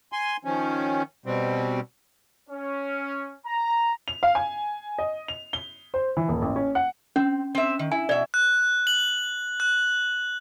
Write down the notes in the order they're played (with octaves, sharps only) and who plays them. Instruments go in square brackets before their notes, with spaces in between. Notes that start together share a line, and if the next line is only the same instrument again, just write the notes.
[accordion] G#5 C6
D#3 F3 C#4
B2 G3 C4
[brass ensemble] C#4
A#5
[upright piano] F7
F5
G#5
D#5
F7
G7
C5
E3
D#1
A1
C#4
F#5
[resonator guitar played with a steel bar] C4 [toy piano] C#4
[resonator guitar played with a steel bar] C4 E5
D#3
[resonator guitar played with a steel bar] E4 [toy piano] G#5
[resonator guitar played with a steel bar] B2 E5 [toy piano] D5
[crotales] F#6
F#7
F#6